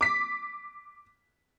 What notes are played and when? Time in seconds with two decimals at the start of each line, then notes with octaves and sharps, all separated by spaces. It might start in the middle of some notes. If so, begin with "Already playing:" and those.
0.01 D6 B6